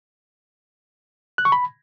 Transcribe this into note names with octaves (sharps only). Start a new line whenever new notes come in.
F#6
C#6
B5